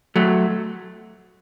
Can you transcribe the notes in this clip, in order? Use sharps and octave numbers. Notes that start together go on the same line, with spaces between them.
F#3 A3